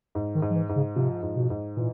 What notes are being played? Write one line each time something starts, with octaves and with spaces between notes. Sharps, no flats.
G#2
D#3
G#2
F3
E3
G#2
C#3
C3 F3
G#2
B2
G#2
A#2 E3